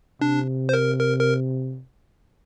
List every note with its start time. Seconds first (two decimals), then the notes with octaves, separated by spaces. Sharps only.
0.21 C3 D4
0.69 C5
0.74 A#4
1.00 A#4
1.20 A#4